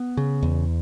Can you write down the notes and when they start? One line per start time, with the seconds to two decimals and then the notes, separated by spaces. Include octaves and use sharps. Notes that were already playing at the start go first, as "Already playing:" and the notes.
Already playing: B3
0.17 C#3
0.42 E2